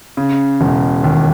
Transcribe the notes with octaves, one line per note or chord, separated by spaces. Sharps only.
C#3
E1
D#2